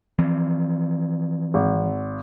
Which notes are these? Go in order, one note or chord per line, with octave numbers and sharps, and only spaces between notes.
E3 F3 C4
G#1